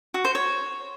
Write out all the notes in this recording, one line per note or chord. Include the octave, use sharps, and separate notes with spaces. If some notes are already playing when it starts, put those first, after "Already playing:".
F#4
C5
C#5